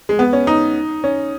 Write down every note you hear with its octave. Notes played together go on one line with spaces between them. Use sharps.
G#3
B3
C#4
D#4
C#4